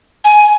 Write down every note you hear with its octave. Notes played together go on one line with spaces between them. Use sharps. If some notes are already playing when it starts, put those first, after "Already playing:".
G#5